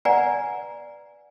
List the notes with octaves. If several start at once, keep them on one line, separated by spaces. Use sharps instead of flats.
B4 D5 F#5 G#5 A#5